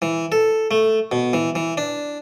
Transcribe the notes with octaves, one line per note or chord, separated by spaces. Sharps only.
E3
A4
A3
B2
E3
E3
D4